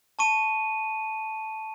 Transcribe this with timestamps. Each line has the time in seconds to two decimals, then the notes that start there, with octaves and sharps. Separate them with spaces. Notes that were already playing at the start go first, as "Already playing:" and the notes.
0.19 A5 C#6 D#7